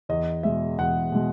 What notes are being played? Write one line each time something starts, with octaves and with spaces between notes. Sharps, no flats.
E2 D#5
B2 G#3 E5
E2 F#5
B2 G#3